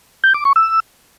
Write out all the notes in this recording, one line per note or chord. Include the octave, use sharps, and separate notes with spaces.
G6
D6
C#6
E6